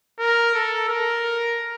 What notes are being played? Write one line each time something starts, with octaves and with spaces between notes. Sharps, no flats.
A#4
A4
A#4